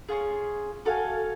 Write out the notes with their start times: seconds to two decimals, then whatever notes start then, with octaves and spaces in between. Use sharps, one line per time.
0.09 C#4 F4 G#4
0.85 F#4 A4 F5 G#5